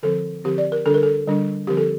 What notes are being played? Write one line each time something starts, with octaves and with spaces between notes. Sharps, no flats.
D3 F3 C4 A4
D3 F3 C4 G4
D5
A#4
D3 G3 D4 A4
A#4
A4
D3 G3 D4
D3 F3 C4 G4
A4